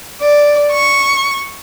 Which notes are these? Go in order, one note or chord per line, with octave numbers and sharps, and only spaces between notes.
D5
C#6